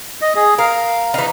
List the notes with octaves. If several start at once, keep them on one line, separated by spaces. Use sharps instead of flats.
D#5
G#4
A#4 F5
E3 D#4